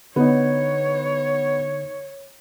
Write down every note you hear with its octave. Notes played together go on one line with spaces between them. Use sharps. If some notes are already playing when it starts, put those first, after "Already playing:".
D3 B3 D#4 C#5